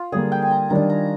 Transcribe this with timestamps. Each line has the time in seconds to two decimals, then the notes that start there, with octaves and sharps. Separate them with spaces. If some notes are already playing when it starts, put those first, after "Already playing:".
Already playing: F4
0.12 D3 G3 A#3 G#4
0.32 G5
0.42 G#5
0.51 A#5
0.70 D#3 G3 D4 A#5
0.90 A#5